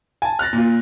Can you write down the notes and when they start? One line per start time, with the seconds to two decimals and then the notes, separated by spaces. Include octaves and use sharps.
0.22 G#5 A5
0.39 F6 F#6 A6 A#6
0.53 A#2 F4